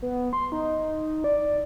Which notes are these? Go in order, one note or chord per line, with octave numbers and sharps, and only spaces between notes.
B3
C6
D#4
D5